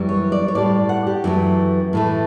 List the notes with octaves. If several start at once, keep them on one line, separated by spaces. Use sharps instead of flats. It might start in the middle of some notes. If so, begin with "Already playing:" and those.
Already playing: F#2 E3 G3
C#5
D5
C#5
A2 G3 D5
F#5
G4
F#2 E3 A3
A2 E3 A3